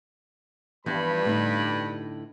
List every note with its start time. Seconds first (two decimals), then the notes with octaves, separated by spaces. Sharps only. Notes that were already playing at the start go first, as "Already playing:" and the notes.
0.86 G2 E3 F3 B3 B5
1.25 A2 D3 D#4